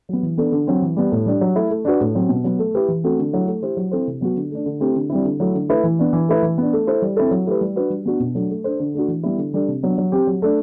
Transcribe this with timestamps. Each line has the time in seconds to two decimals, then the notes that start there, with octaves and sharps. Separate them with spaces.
0.09 F#3 B3
0.23 E3
0.38 B3 D4 A4
0.52 D3
0.67 F#3 C4
0.82 E3
0.97 G3 B3
1.12 A2
1.26 G3 D4
1.41 F#3
1.55 A3 E4
1.70 A3
1.85 D4 F#4 B4
2.01 A2
2.15 F#3 C4
2.29 B2
2.44 F#3 B3
2.59 A3
2.74 E4 G4 B4
2.88 E3
3.04 A3 C4 F#4
3.19 D3
3.33 F#3 A3 E4
3.47 A3
3.63 E4 G4 C5
3.77 F#3
3.91 C4 E4 A4 C5
4.07 C3
4.21 F#3 B3 F#4
4.36 D3
4.51 A3 D4
4.66 D3
4.80 A3 C4 E4 G4
4.96 D3
5.10 G3 C4 E4
5.25 D3
5.40 F#3 A3 E4
5.54 D3
5.69 A3 E4 B4
5.84 E3
5.99 B3 D4
6.13 E3
6.28 A3 E4 B4
6.42 E3
6.58 B3 D4
6.73 A3
6.87 E4 A4 C5
7.02 G3
7.16 C4 E4 A4
7.31 F#3
7.46 A3 E4 G4 B4
7.61 G3
7.76 D4 F#4 B4
7.90 G3
8.05 B3 D4 F#4
8.20 B2
8.35 F#3 A3 D4
8.50 A3
8.64 D4 A4 C5
8.80 D3
8.94 A3 D4 F#4
9.08 E3
9.23 G3 B3 E4
9.38 D3
9.54 G3 D4 A4
9.68 C3
9.83 F#3 B3 D4
9.98 F#3
10.12 C4 G4
10.27 F#3
10.42 A3 D4